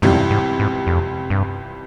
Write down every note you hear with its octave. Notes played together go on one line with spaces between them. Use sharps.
C#2 G2 C3 E3 G3
F2
G2
G#2
G#2
F2
G2